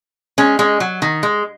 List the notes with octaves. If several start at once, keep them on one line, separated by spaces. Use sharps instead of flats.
G#3 C#4
G#3 C#4
F#3
D#3
G#3